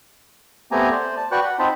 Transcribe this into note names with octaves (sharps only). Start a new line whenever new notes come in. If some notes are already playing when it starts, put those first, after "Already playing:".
A3 B3 C4 G4 G#5 A#5
C5 D5
A5
F#4 B4 D5 G5 C#6 F#6
F#5
C4 D#4 F4 C5 A5 B5